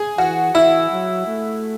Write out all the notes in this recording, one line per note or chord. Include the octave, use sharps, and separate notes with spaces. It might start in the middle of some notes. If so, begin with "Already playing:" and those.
Already playing: G#4
E3 F#4
E3 E4
F#3
A3